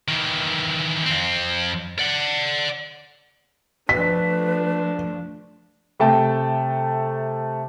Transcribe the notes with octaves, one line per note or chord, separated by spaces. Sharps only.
D#3 E3
F2 C4
D5 F#5
F3 A3 D4 B4 B6
C3 A3 G5 A5